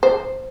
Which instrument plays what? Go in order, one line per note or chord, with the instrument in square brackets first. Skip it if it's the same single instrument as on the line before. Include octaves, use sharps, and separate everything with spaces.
[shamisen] C5